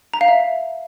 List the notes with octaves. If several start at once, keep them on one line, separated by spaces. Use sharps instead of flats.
A#5
F5
E5